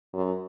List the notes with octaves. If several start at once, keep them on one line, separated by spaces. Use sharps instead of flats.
F#2